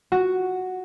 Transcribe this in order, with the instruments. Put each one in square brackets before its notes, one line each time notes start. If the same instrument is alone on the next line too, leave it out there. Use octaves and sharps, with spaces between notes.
[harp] F#4